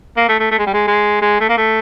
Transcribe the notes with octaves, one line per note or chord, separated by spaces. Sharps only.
A#3
A3
A3
A3
G#3
G3
G#3
G#3
G#3
A3
A#3
A3